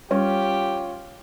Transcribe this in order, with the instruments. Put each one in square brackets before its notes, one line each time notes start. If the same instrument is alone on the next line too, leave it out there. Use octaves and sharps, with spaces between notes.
[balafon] G3 [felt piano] C#4 [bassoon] F4 [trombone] G4